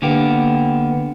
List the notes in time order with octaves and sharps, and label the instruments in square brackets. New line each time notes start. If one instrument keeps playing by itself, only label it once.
[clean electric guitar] D3 A#3 B3 G4